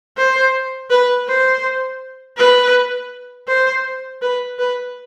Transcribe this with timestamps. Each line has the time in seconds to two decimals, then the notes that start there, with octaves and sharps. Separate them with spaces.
0.18 C5
0.90 B4
1.28 C5
2.38 B4
3.48 C5
4.22 B4
4.59 B4